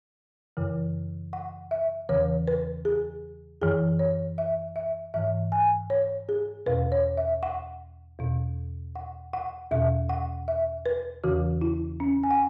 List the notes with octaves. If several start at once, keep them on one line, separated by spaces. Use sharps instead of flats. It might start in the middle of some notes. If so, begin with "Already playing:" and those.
F#2 C#3 E3
F#5
E5
E2 C#3 E3 C#5
B4
G#4
F#2 E3 G#4
C#5
E5
E5
G#2 E3 E5
G#5
C#5
G#4
E2 B2 B4
C#5
E5
F#5
E2 B2
F#5
F#5
E2 B2 E5
F#5
E5
B4
E2 C#3 E3 F#4
E4
C#4
G#5
F#5